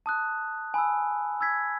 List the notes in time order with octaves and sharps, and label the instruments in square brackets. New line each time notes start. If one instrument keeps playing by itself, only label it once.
[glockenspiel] A5 D#6 F#6
G#5 B5 E6
E6 G#6 B6